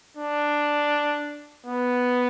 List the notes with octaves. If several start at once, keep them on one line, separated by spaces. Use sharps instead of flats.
D4
B3